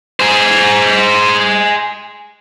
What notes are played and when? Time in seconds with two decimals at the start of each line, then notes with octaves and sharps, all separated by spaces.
0.20 G#4 C5